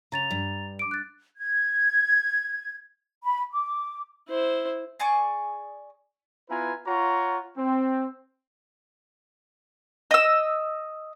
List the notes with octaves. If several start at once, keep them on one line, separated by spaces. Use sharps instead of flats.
C#3 A#5 A6 F7
G2
D6 D7
F#6 A6
G#6
B5
D6
E4 C5
G#4 D5 G#5 C#6
B3 E4 F4 B4 G#5 A#5
F4 C#5 F#5 A#5 C#6
C4
D#5 E6